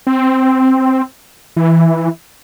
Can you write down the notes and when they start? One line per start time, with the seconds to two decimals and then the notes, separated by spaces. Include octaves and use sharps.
0.07 C4
1.57 E3